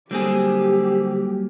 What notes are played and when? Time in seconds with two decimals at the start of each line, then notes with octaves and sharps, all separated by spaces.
0.11 D3 F#3 G3 A#3 C4 G4 G#4